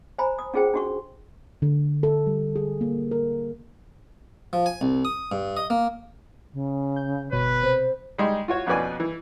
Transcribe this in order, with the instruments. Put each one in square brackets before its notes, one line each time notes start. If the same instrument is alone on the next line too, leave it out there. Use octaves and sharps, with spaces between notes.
[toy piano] C5 G#5 A#5 B5
D#6
C#4 F4 G#4 C5 G5
D4 F#4 C#6
[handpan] D3
A4
G3
G#4
A#3
A#4
[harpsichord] F3
G#5
C2
D#6
G2
D#5
A#3
[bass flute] C#3
[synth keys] G6
[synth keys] G1 B2 C#5 [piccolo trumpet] B4
[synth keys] C3 B5 [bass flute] C5
[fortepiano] G3 G#3 D#4 C6
F4 F#4 C#5
F2 B2 C#4 B4 D5 G#5
E3